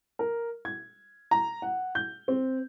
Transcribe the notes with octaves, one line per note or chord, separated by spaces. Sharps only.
A#4
G#6
A#5
F#5
G6
C4